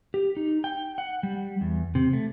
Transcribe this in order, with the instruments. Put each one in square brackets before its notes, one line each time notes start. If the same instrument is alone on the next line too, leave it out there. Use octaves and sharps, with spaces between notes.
[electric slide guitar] G4
D#4
G5
F#5
G3
E2
C3
A3